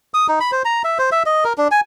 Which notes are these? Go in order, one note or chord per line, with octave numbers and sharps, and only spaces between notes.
D#6
D#4
B5
C5
A#5
E5
C5
E5
D#5
A#4
D4
G#5